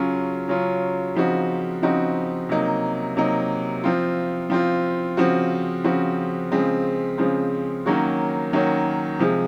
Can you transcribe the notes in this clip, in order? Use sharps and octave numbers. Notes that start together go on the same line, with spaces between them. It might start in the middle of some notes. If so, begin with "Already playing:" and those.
Already playing: C#3 F#3 C#4 F4
C#3 F#3 C#4 F4
C#3 F3 C4 D#4 F#4
C#3 F3 C4 D#4 F#4
C3 F#3 A#3 D#4
C3 F#3 A#3 D#4
F3 C4 F4
F3 C4 F4
C#3 F3 C4 F#4
C#3 F3 C4 F#4
C#3 F3 G#3 C4
C#3 F3 G#3 C4
D#3 F#3 A#3 C#4 F#4
D#3 F#3 A#3 C#4 F#4
C3 F3 G#3